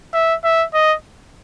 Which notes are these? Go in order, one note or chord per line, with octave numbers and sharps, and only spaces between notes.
E5
E5
D#5